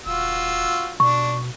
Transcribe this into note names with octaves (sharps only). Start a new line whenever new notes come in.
D#1 F4 F#4 E6
B2 D4 C#6